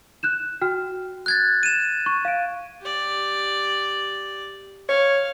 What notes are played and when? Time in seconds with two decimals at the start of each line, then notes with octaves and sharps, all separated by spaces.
0.23 F#6 G6 E7
0.61 F#4 G5 F6
1.26 F#6 G#6 A6
1.63 D#7 E7
2.06 C#6
2.25 F5 D7
2.81 G4 D5
4.89 C#5 F5